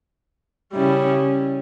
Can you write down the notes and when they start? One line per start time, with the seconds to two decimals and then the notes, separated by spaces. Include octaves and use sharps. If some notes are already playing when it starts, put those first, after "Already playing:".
0.73 C#3 G3 C#4 E4